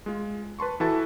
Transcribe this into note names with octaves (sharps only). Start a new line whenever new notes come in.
G#3 F4
B4 A5 C6 C#6
E3 E4 F#4 A4 B4 A5